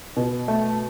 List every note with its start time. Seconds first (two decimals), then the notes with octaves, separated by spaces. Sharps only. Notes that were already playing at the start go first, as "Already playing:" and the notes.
0.17 B2
0.48 A3